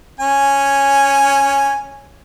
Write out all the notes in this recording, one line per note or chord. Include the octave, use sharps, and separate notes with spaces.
C#4 G#5